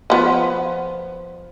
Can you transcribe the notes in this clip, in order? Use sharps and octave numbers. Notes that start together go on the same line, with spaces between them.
F3 B3